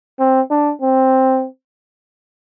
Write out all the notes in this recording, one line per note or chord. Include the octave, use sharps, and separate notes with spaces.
C4
D4
C4